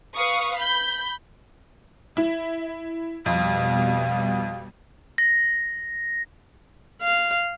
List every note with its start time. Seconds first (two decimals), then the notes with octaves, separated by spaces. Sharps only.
0.16 B4 F5 C#6 D#6
0.57 B5 G6
2.17 E4 E5
3.26 F2 B2 G3 F5
5.18 A#6
7.02 F5